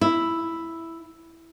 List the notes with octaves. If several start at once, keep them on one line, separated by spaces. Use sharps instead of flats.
E4